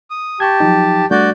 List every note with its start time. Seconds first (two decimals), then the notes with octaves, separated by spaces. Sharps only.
0.10 D#6
0.40 G4 A5 C#6 G6 G#6
0.60 F3 F#3 D#4
1.11 G3 A3 D4 F#4 D5 G6